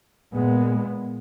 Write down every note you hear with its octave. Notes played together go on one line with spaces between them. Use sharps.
A#2 G#3 B3